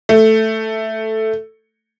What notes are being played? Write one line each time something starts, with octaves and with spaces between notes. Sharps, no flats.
A3